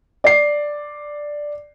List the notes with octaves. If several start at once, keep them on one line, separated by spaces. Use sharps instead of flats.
D5 C7